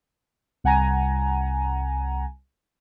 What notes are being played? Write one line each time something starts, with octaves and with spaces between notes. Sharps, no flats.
C2 F#5 G#5 A#5